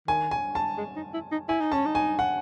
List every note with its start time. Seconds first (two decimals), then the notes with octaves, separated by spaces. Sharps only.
0.08 D#3 G#5
0.31 G#5
0.55 A5
0.78 G#3
0.96 D#4
1.14 E4
1.32 D#4
1.49 E4 G#5
1.61 D#4
1.72 C#4 A5
1.86 D#4
1.95 G#5
2.19 F#5